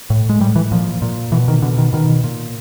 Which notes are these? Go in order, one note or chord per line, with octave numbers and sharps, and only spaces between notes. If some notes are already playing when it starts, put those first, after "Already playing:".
A2
G#3
A2 G3
E3
A#2 F3
A#2
B2 E3
D#3
B2 D3
D#3
B2 D#3
A#2